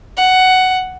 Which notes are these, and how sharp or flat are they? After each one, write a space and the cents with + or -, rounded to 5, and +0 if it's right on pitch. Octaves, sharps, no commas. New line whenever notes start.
F#5 +10